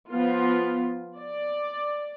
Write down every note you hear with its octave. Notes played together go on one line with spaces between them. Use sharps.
F3 B3 F4
D5